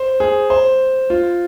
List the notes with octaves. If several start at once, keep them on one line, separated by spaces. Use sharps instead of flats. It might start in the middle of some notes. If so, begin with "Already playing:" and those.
Already playing: C5
G#4
C5
F4